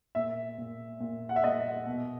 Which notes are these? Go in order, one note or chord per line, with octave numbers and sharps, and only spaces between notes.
A#2 E5
A#2
A#2
F#5
E5
A#2 D#5
B2